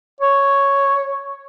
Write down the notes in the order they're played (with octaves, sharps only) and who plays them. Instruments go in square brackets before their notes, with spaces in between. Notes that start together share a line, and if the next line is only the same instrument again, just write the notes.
[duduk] C#5